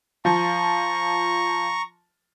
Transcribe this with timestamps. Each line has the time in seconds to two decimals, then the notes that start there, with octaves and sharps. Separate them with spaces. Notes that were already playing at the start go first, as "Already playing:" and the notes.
0.25 F3 A#5 C#6